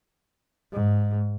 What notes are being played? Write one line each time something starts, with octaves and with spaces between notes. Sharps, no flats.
G#2